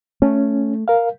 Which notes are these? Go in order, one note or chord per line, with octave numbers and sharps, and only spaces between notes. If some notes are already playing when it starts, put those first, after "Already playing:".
A3 C#4
A#4 F5